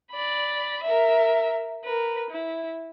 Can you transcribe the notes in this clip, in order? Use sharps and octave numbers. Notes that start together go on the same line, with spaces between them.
D5 B5
A#4 E5
A#4 B4
E4